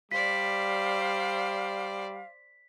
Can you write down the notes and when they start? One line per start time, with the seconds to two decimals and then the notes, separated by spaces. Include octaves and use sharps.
0.12 G3 C5 D5 F5 B6